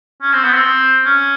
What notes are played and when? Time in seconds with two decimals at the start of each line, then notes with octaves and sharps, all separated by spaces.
0.22 C#4
0.33 C4
0.44 B3
0.54 C4
1.05 C#4